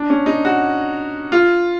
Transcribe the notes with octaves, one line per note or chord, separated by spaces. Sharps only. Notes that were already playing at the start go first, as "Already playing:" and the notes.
Already playing: D4
C#4
D#4
F#4
F4